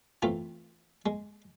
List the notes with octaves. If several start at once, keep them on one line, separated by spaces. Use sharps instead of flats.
E3 A3 C4 F4
G#3